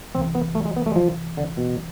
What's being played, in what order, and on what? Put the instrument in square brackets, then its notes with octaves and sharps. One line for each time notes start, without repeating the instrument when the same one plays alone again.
[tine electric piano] C2 C3 E3 [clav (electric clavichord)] C4
[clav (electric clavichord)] B3
A3
G#3
B3
A3
G#3
F3
D3
B2